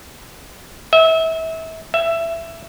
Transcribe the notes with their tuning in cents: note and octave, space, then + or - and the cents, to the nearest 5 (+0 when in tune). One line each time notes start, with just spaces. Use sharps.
E5 -30
E5 +15